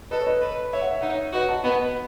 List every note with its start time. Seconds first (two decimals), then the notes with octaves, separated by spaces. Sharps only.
0.11 A4 B4 D#5
0.21 C#5
0.27 B4 D#5
0.41 B4
0.73 C#5 E5
0.81 F#5
0.91 E5
1.01 D#4 F#5
1.10 C#5 E5
1.33 F#4 B4 D#5
1.48 F#5 A5
1.64 B3 D#5 F#5